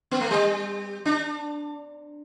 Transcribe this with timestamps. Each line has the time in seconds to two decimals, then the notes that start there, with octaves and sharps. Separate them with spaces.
0.11 B3
0.21 A3
0.31 G3
1.05 D4